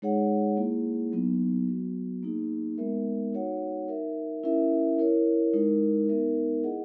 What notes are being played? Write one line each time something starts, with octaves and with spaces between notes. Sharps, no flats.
G#3 D#4 G#4 C#5 F#5
A#3 E4 G#4
F#3 B3 D#4
F#3 B3 F#4
A#3 D#4 G#4
G#3 B3 D#4 A#4 E5
D#4 F#4 C#5 F#5
D#4 A#4 E5
C#4 E4 A#4 E5
E4 A#4 C#5
G#3 D#4 A#4
B3 D#4 A#4 E5
E4 G#4 D#5 F#5